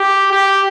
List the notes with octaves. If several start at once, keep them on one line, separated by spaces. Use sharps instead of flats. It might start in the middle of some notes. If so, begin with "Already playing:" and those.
Already playing: G4
G4